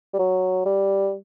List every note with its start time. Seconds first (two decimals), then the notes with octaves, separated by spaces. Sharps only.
0.13 G3
0.19 F#3
0.65 G3